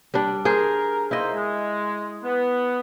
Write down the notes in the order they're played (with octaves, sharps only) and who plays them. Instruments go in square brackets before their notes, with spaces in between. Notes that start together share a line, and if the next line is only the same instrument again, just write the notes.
[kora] G3 D4
[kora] G#4 C5 [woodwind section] A#4
[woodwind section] A#3 D#4 C5 [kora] E4 D#5
[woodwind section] G#3
B3